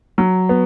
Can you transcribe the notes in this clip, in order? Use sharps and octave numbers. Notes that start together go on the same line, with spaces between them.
F#3
B3